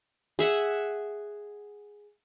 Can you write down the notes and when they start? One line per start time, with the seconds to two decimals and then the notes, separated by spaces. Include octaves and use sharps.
0.39 G#4 E5 F#5